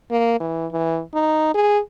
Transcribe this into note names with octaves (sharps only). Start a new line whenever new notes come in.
A#3
E3
E3
D#4
G#4